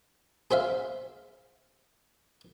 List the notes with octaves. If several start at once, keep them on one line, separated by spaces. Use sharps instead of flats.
G#4 C5 E5 F5